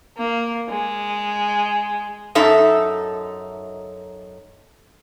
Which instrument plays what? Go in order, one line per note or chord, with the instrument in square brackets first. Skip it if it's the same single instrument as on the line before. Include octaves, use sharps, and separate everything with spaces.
[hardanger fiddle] A#3
G#3
[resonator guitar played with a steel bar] F#2 D#4 A4 E5